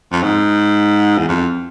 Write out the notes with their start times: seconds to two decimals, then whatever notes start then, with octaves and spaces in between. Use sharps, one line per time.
0.12 F2
0.23 G#2
1.18 E2
1.28 F2